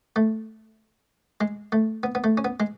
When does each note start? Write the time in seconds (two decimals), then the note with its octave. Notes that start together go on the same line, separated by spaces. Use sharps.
0.16 A3
1.41 G#3
1.72 A3
2.03 B3
2.15 B3
2.24 A3
2.37 C#4
2.45 B3
2.60 G#3